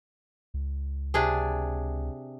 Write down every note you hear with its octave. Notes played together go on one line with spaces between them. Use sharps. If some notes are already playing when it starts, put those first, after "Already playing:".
C#2
C3 D4 G#4